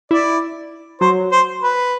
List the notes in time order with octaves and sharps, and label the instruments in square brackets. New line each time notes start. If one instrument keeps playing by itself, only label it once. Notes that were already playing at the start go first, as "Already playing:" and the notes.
[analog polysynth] E4 [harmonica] D5
[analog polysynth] F#3 [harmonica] C5
[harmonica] C5
B4